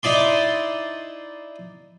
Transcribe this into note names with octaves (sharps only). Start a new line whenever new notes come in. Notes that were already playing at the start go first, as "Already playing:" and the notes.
D#4 E4 D5 C6